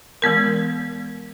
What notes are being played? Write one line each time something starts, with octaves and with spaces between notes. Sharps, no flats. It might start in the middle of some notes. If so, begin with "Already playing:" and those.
E3 G#3 B3 A#4